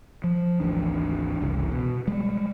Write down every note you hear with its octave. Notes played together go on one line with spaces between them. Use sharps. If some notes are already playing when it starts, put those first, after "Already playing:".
F3
G#1 D2 E3 D4
F#1 C2 E3
B2
G3 G#3